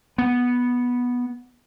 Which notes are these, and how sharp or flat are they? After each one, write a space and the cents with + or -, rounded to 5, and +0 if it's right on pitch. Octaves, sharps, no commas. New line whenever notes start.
B3 -10